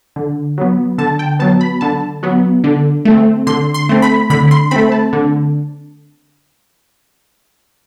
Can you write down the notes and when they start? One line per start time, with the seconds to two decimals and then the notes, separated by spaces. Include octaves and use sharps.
0.16 D3
0.58 F#3 B3
0.98 D3 A5
1.19 G5
1.39 F#3 B3 A5
1.61 B5
1.81 D3 A5
2.23 F#3 B3
2.64 D3
3.05 A3 C4
3.47 D3 C6
3.74 C6
3.89 A3 C4
4.02 B5
4.30 D3 B5
4.51 C6
4.71 A3 C4 B5
4.92 A5
5.13 D3